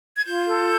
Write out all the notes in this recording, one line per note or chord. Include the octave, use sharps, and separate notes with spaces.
G#6
F4 G6
A4